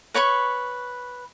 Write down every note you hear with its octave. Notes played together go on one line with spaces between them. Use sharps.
B4 C#5 B5 C#6